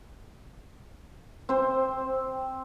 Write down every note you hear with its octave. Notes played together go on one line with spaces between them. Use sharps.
C4 C5